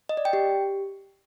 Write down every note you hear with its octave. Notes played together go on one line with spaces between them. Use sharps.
D#5
D5
G5
G4